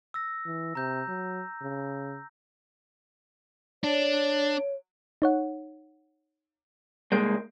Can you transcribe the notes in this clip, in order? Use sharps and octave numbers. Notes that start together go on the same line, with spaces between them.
E6 A#6
E3
C3 A#5 G6
F#3
C#3
D4 C#5
D#4 C#5 F#5
C2 G#3 A#3 G6 D7